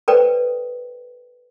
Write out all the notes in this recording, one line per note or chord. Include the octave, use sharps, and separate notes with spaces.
A4 B4 C5 D5 G5